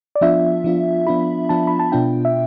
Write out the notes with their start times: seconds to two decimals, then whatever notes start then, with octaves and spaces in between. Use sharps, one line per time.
0.15 D5
0.21 F3 B3 D4 F4 E5
0.64 F3 B3 D4 F4
1.07 F3 B3 D4 F4 B5
1.49 F3 B3 D4 F4 A5
1.67 B5
1.79 A5
1.92 B2 B3 D4 F4 G5
2.25 E5